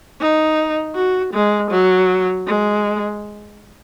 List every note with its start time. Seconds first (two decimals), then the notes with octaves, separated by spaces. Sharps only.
0.21 D#4
0.95 F#4
1.33 G#3
1.71 F#3
2.47 G#3